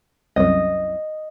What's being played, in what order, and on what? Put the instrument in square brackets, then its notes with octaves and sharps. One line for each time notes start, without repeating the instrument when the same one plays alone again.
[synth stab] C2 F#2 [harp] D#5